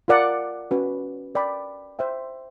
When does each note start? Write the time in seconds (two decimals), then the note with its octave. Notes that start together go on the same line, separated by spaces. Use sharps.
0.08 F4 A#4 D5 F#5
0.71 C#4 F#4 B4
1.35 A#4 D5 G5 B5
1.99 C5 E5 G5